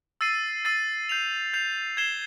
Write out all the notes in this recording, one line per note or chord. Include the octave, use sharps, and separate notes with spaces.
E6 A6 C7 D#7
E6 A6 C7 D#7
G6 C7 F7
G6 C7 F7
G#6 C7 E7 G7